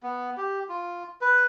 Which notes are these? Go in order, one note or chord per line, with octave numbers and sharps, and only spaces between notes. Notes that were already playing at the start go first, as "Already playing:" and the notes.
B3
G4
F4
B4